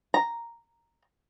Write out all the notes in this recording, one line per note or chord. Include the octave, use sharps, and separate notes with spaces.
A#5